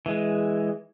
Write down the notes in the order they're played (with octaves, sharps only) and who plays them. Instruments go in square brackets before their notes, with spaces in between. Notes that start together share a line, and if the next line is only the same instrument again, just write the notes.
[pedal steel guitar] E3 G#3